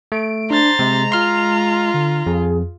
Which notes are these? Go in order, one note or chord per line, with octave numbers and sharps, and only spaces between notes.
A3 D7
D4 C5 A#5 A6
C3 G#3
F4 C6 F6
D3
F2 G#4